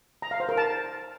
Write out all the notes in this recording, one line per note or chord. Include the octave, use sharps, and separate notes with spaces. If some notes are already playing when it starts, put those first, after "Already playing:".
A#5
F5
C5
A#4
A5